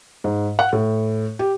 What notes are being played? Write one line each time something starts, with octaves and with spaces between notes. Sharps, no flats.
G#2
F#5
A2
G4